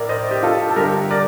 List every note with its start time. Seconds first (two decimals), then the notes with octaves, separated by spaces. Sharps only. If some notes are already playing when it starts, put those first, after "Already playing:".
Already playing: A2 A#4 D5
0.09 C5 D#5
0.31 G4
0.43 F4 A4
0.70 A4
0.76 G2 D3 G4 A#4
1.11 A#4 D5